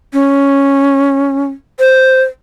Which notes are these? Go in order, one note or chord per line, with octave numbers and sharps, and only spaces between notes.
C#4
C5